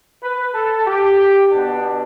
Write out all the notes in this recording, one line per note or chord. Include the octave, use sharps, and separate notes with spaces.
B4
A4
G4
B2 B3 D4